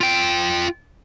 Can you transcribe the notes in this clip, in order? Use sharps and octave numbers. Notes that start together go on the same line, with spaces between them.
F4 G5